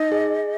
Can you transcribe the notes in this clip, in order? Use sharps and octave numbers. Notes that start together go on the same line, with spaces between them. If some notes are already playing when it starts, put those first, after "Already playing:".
Already playing: D#4 D#5
G#4